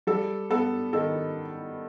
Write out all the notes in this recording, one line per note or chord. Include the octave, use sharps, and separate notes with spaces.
G3 A4
B3 A4
D#3 A4